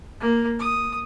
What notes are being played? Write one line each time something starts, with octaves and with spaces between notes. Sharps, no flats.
A#3
D#6